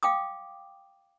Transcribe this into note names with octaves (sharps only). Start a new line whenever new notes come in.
F5 G5 D6 D#6